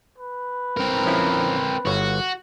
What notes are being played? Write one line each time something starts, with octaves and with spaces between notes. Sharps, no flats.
B4
C4 A#4
F3 C#4 E4
G1 F#4 C#5